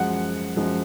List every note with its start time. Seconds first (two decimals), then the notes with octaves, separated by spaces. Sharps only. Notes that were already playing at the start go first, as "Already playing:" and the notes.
Already playing: F#2 F3 G#3 F#5
0.57 F#2 F3 G#3